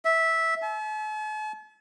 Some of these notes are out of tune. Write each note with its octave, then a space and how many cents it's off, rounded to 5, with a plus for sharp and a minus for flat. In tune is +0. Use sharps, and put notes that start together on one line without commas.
E5 -10
A5 -45